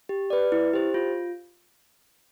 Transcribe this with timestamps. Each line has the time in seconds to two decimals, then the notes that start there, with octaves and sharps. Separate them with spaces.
0.09 G4
0.30 B4 D5
0.52 E4
0.73 G4 C5
0.94 F4